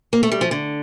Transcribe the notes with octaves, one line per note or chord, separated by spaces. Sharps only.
A#3
A3
G3
F3
D3